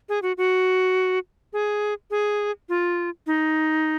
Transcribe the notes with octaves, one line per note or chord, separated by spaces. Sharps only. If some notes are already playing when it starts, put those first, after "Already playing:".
G#4
F#4
F#4
G#4
G#4
F4
D#4